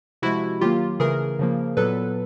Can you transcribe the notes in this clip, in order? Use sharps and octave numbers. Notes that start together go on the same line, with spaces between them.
C3 F3 G#3 E4 F#4
D#3 F#3 A#3 F4 G4
C#3 E3 A3 G#4 A#4
C#3 F3 A#3
A#2 F#3 B3 A4 B4